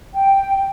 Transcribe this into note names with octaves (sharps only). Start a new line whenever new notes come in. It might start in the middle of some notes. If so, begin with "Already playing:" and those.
G5